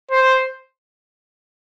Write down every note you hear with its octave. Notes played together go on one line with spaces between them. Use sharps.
C5